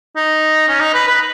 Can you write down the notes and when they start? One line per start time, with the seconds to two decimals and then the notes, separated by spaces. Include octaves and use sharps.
0.16 D#4
0.68 C#4
0.81 D#4
0.94 B4
1.07 B4